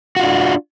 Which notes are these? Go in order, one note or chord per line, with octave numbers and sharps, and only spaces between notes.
D4 F4 F#4